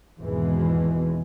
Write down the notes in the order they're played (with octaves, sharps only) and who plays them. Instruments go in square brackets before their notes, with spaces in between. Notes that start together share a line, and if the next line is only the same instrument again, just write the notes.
[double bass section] G#1 E2 B2 E3 G#3